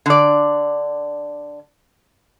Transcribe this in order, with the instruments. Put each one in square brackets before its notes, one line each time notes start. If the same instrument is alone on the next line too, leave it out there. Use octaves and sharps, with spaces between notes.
[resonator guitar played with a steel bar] D3 D5